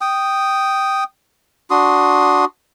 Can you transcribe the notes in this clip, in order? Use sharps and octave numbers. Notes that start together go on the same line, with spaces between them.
G5 D#6
D4 F#4 C6 D#6